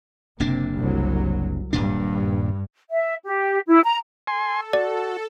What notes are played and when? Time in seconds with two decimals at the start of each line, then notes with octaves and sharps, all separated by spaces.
0.40 F#1 C3 A#3 D4
0.77 C2 F#3
1.73 D#1 G2 A#2 D4
2.90 E5
3.24 G4
3.67 E4
3.83 A#5
4.27 A4 G#5 C6
4.73 F#4 D5